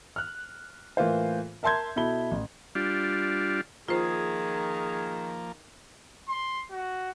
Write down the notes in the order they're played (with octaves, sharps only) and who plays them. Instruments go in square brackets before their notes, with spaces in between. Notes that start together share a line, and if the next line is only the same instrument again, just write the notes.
[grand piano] F6 F#6
A2 E3 A#3 F4 C5
A#4 E5 A5 C6 G6 G#6
B2 E4 A4 B5 G7
A1
[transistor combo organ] G3 D4 F4
[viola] D#3 [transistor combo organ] F3 A#3 [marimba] F4 C5 [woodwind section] G#4
[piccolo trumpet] C6
F#4